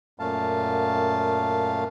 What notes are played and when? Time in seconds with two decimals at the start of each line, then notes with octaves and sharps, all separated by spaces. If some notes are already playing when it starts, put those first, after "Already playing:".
0.20 F#2 A#2 A3 F5 A5